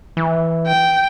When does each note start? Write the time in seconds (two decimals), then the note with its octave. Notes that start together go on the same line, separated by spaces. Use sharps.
0.17 E3
0.67 G5